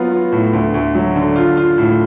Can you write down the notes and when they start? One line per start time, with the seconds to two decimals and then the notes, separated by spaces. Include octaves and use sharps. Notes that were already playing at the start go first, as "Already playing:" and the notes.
Already playing: F#3 B3 F4
0.12 F4
0.32 A2
0.53 D2
0.74 D2
0.95 F#3
1.15 D3
1.36 F4
1.57 F4
1.78 A2